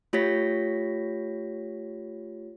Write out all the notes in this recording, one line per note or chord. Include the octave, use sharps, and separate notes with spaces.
A3 F4 G4 C#5 A#6 B6